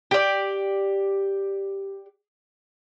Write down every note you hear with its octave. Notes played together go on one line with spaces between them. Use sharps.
G4 D5